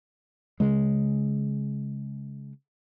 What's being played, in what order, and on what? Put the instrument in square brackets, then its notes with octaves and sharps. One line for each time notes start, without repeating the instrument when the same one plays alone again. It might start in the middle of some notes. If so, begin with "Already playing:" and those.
[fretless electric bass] C#3 G#3